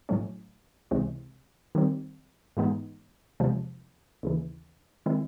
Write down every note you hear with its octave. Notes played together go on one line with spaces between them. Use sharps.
A2 F#3 A3 C#4
C#2 C3 E3 G#3 C4
D#3 G3 C4
G#2 E3 G#3 B3 D#4
E2 C3 F3 G#3
D#2 C#3 E3
D#3 G#3 C4 E4